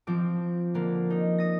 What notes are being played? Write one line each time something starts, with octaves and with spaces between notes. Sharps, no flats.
F3 C4 D6
D3 A#3
D#4
D#6 A#6